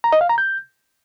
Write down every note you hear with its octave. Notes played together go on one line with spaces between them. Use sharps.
A#5
D#5
F5
A#5
G6